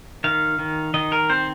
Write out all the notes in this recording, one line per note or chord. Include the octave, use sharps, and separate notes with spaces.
D#3 F5
D#3
D#3 D#5
A#4
C4 C5